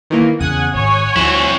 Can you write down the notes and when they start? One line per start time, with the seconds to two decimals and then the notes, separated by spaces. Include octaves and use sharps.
0.10 D#3 E3 A#3
0.41 E2 C#3 F#5 G#5 D#6
0.74 G#1 C#5 F#5 G#5
1.16 D2 F3 C4 E4